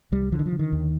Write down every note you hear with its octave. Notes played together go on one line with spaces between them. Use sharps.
C2 G3
D3 F3
D#3
F3
D3
D#3
D#2